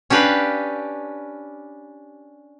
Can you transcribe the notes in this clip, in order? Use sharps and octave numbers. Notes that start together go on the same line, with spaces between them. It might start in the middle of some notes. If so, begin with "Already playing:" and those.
C#4 D4 G4 B4 F5